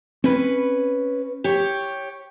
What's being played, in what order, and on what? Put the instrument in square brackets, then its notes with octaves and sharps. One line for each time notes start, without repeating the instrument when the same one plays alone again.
[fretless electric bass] C4 [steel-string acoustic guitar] C#4 B4
[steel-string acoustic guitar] G4 C#5